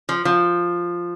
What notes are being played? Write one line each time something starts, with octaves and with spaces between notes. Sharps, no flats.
F3
F3